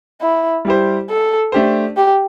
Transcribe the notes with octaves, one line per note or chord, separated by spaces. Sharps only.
E4
G3 E4 G4 C5
A4
A3 D4 G4 C5
G4